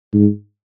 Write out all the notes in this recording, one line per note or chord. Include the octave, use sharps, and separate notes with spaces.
G#2